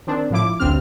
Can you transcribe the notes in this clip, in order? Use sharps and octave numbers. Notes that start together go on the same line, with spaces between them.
D#3 C4 D4
A2 F3 E4 D6
A1 D2 G2 C4 F6